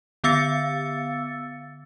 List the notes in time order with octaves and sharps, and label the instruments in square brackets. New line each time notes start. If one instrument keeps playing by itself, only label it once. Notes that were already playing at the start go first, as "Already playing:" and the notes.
[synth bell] D3 B3 F5 E6 A6 C#7